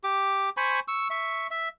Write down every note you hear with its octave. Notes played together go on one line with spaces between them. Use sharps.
G4 D6
C5 G#5 B5 C#6
C#6 E6
E5 C#6
E5